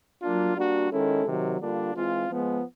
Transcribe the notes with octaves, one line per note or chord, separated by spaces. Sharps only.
F#3 A#3 D4 F4
G3 A#3 D4 F#4
D#3 G#3 C#4 E4 A4
C3 D#3 F#3
D3 G3 A#3 D4 F4
E3 G#3 C4 F4
F3 G#3 B3